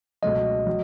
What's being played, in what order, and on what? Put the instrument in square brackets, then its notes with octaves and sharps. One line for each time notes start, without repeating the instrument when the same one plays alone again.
[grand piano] C#2 B2 F#3 A3 [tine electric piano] D#5
[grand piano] F#3